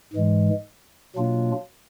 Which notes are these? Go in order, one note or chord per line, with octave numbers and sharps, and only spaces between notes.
G#2 E3 G#3
B2 F#3 A#3 D4 F4